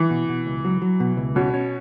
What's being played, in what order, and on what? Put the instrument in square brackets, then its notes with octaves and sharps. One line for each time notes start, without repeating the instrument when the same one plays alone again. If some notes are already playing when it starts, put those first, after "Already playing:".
Already playing: [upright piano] E3
[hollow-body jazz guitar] B2
B2
C#2
F#3
F#3
B2
C#2
[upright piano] B2 [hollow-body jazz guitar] C#4
[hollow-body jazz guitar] C#4